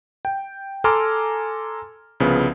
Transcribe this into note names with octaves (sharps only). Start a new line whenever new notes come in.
G5
A4 G#5 A#5 C6 D6 F6
C2 C#3 F3 B3